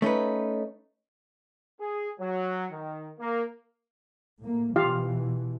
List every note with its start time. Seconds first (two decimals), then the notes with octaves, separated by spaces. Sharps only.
0.02 A3 C#4 D#4 B4
1.80 G#4
2.20 F#3
2.71 D#3
3.19 A#3
4.40 A2 A#3
4.76 B2 E3 F4 G4 F5